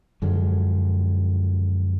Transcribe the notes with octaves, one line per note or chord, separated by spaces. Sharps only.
F#2 D3 F3 G#3